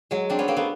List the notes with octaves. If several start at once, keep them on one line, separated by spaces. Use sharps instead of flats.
F#3 G#3
C4 D4
B3 C#4
A#3 C4
A3 B3